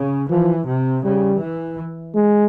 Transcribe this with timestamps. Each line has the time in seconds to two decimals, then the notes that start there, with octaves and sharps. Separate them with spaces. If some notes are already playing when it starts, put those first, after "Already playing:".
Already playing: C#3
0.30 E3 F3
0.67 C3
1.04 C#3 G3
1.41 E3
2.15 G#3